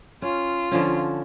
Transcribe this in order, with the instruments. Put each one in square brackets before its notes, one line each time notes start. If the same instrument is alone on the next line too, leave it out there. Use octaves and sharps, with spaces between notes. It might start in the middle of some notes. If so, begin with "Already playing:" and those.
[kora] C#4 [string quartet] F4
[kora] D3 F3 C#4